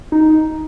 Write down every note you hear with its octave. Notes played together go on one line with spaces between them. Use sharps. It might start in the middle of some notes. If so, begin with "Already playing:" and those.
D#4